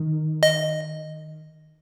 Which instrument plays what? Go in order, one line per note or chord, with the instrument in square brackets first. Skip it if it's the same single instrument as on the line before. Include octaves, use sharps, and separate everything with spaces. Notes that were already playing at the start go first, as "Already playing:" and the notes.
Already playing: [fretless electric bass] D#3
[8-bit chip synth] D#5